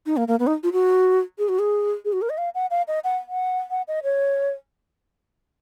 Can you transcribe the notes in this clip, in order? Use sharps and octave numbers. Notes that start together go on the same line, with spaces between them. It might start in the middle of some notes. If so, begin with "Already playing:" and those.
D#4
A#3
A#3
B3
D#4
F4
F#4
G#4
F#4
G#4
G#4
F#4
A#4
D#5
F5
F#5
F5
D#5
F#5
F#5
F#5
D#5
C#5